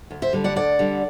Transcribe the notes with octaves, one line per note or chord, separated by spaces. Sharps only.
D2
C5 E5
D3 G3
D5 F#5
D2 D5 F#5
D3 G3